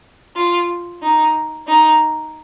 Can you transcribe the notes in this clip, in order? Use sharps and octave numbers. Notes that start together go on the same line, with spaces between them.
F4
D#4
D#4